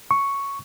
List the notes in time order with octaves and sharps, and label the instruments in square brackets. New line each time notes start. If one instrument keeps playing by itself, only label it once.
[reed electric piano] C#6